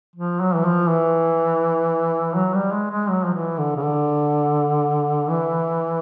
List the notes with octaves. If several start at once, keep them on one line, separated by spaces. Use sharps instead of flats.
F3
F#3
E3
F3
E3
F#3
G3
G#3
G#3
F#3
F3
E3
D3
C#3
D3
E3